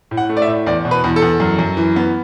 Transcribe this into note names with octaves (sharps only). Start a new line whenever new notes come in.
A2
F#5
A3
D5
E5
A2
E2 D5
B2
B4
E2
A4
E2
F#2
F#2
E3
B3